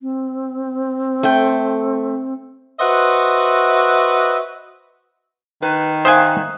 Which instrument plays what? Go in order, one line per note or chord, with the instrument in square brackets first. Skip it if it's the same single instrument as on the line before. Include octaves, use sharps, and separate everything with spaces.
[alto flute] C4
[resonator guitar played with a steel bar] A3 G5
[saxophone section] F#4 B4 C5 D#5 E5 F#5
[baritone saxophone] D#3 [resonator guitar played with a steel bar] B4
[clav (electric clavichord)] C5 G5 G#5 [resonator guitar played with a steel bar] E5 F5 [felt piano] D#6 F#6